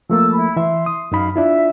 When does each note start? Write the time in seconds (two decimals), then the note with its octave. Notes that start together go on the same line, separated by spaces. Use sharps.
0.10 F3 A3 A#3 A5 E6
0.33 E4 B5
0.56 E3 E5 C6
0.86 D#6
1.12 F#2 D#4 F5 B5
1.36 D4 E4 F4 E5